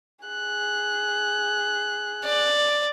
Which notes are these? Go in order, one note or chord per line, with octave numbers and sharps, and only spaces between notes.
G#4 F#6
D5